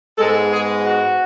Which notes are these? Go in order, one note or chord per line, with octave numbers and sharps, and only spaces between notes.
G#2 G#3 B3 A4
G#4
F#4